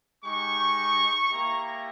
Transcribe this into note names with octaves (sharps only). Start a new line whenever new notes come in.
G#3 D#4 G4 C#6
A#3 E4 G4 A#5